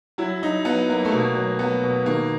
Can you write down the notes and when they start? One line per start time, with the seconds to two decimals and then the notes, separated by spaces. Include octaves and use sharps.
0.18 F#3 E4
0.42 F#3 D#4
0.65 F#3 B3
0.89 F#3 A#3
1.05 A3
1.12 B2 A#3
1.35 F#3
1.59 F#3 B3
1.84 B2
2.06 D#3 A#3